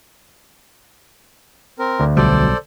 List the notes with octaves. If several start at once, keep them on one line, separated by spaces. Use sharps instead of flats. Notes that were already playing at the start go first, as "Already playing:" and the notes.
C4 A#4
D2
B1 B2 G3 A4 C5 D5